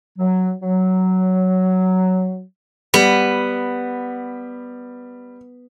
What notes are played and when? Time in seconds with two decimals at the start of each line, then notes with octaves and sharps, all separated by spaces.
0.18 F#3
0.62 F#3
2.94 G3 B3